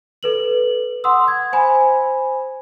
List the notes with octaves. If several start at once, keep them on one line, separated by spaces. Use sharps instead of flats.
A4 B4 F#7
F#5 C6 D#6 E6
G#6
C5 G#5 B5